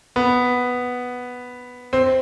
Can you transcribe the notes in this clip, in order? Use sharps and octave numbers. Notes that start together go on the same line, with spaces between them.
B3
C4